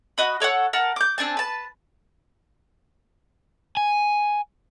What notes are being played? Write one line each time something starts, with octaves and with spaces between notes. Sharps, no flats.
F#4 D#5 B5
A4 C#5 D5 F#5
A#4 F#5 A5
D6 G6
C4 D4 G#5 A5
B4 A5
G#5